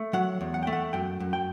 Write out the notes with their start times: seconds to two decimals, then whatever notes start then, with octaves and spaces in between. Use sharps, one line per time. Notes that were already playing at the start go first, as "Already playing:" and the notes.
Already playing: A3
0.13 F#3 F#5
0.41 E2
0.54 F#5
0.63 G5
0.67 A3
0.73 F#5
0.93 F#2 G5
1.20 F#2
1.33 G5